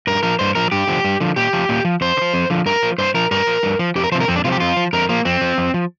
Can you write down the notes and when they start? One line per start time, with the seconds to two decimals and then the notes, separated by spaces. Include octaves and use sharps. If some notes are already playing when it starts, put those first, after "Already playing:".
0.07 G2 A#4
0.23 F3 A#4
0.39 G2 C5
0.55 F3 A#4
0.72 G2 G4
0.87 D3 F3
1.04 G2
1.20 D3 F3
1.36 A#2 G4
1.53 F3
1.69 A#2
1.85 F3
2.01 F2 C5
2.17 D3
2.22 F3
2.34 F2
2.50 D3 F3
2.66 G2 A#4
2.82 F3
2.98 G2 C5
3.14 F3 A#4
3.31 G2 A#4
3.47 F3
3.63 G2
3.79 F3
3.95 F2 G4
4.04 A#4
4.12 C3 F3 C5
4.20 A#4
4.28 F2 C4
4.36 D4
4.44 C3 F4
4.48 F3 G4
4.60 F2 F4
4.77 F3
4.93 F2 A#4
5.09 F3 A#3
5.25 F2 C4
5.41 F3
5.58 F2
5.74 F3